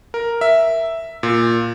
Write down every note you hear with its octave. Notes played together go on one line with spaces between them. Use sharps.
A#4
E5
A#2